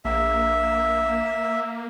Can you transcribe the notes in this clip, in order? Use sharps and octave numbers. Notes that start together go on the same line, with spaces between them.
A#1 A#3 E5